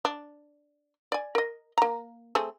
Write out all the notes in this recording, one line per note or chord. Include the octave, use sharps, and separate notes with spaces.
D4
D5 G#5
A#4 D#5
A#3 A#5
A3 C4 G#4